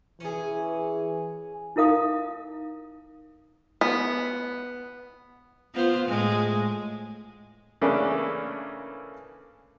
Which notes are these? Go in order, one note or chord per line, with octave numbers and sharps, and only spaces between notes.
E3 C#4 G#4
D#4 E4 A#4 F5 D#6
B3
B3 F4 C5
A2 G#3
C#3 E3 A3 A#3 C#4 D4